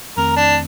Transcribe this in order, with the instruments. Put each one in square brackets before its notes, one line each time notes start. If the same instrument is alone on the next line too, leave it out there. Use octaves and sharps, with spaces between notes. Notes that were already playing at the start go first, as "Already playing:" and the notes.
[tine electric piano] F2 D#3 A3 C4 [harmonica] A#4
[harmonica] D4